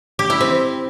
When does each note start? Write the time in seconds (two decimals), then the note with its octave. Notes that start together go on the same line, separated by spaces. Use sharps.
0.19 G4
0.30 E4
0.41 C4